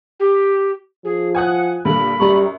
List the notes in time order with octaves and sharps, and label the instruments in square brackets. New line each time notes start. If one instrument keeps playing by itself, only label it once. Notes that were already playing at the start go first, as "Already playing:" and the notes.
[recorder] G4
[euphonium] F3 [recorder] G#4
[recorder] F#5 [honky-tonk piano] G#5 D#6 F#6
[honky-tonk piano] G2 A#2 D3 [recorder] B5
[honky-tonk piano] F#2 A#5 C#6 [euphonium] G3